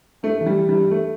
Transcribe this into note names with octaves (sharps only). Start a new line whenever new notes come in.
G2 A3
E3
G3
E3
G3
G2
A3